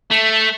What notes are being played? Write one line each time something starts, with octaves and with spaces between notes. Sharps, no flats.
A3